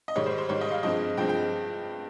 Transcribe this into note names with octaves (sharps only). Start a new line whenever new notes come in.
D#5
G#2 D#3 G3 C#5
C5
C5
G#2 D#3 G3 C#5
D#5
F5
G2 F3 G#3 C4 D#5
G2 F3 G#3 C4 G5
G5